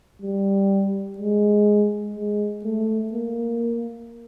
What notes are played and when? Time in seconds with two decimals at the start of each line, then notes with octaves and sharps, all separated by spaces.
0.22 G3
1.19 G#3
2.16 G#3
2.65 A3
3.13 A#3